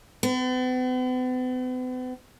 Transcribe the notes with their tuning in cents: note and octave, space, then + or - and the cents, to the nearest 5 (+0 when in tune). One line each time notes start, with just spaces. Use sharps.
B3 +45